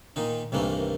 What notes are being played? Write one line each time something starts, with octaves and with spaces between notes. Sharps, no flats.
A#2 D#3 D#4
C2 G2 D#3 E3 A3 A#3